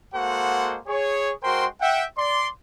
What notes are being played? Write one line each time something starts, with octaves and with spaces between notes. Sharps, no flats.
G#3 A#3 F#4 A4 C5 F#5
G#4 C#5
G#3 F#4 A#4 C5 G5 C6
E5 F#5 G5
D5 C6